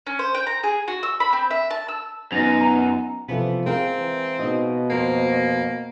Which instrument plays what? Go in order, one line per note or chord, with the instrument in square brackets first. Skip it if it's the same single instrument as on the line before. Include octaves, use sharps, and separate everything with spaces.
[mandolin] C#4
C5
G5
A#5
G#4
F#4
E6
B5
C4
E5
A5
E6
[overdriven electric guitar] F#2 [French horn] B3 [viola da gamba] D#4 [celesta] A#6 F7
[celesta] A#5
[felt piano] C3 F3 A4 [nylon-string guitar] E3 E4 [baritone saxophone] B3
[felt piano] G#3 F5 [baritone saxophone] C4 [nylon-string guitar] A#4
[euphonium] E3
[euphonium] B2 [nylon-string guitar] D#4 G#4 D#5
[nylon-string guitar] F2 C5 [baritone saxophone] A#3